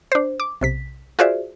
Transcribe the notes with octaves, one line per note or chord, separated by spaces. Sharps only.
D4 C5
D6
B1 C3 B6
F4 F#4 G#4 C5 D5 E5